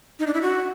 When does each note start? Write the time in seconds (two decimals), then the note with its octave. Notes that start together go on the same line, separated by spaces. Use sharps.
0.19 D#4
0.27 D4
0.34 E4
0.42 F#4